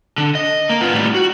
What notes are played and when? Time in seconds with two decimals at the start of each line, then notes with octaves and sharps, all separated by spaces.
0.18 D3
0.35 D#5
0.70 A#3
0.81 B3 F4
0.93 A2 G3
1.14 F#4